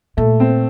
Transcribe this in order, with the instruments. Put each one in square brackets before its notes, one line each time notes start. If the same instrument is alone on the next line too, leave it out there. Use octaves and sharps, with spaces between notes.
[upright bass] A#2 [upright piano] A3
[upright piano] C4